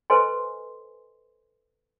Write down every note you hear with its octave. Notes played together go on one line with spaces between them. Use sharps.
A4 B4 C5 D#5 G#5 C6